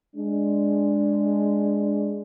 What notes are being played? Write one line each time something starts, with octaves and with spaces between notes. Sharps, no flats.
G#3 D4